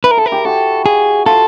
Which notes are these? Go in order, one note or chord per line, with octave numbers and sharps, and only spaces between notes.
E4 B4
A#4
G#4 A4
A#4
G4
F#4 A4
G#4
F4 A4